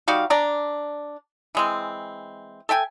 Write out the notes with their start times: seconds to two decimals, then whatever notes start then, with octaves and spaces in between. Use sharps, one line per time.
0.08 G3 D#4 F#4 F5
0.30 D4 D5 A#5
1.55 E3 G#3 C4
2.69 A4 E5 G5 G#5